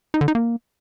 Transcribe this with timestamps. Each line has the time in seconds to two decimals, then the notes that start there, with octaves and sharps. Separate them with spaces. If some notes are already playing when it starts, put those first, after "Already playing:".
0.14 D#4
0.21 D3
0.28 D#4
0.35 A#3